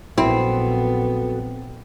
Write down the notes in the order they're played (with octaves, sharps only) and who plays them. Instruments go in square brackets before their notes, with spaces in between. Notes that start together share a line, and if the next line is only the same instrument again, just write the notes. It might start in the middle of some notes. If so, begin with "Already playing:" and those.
[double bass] A#1 B3 [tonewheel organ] F#3 F#4 A4 [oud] C4 [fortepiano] E4